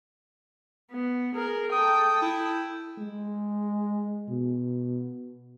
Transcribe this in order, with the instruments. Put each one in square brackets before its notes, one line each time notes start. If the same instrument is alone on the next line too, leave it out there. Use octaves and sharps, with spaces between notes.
[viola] B3
G#4 A#4
[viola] A4 G5 [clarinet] D#6
[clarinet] E4
[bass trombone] G#3
B2